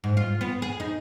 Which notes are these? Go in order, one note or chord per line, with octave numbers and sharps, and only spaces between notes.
G#2
F4
B3
G#4
D#4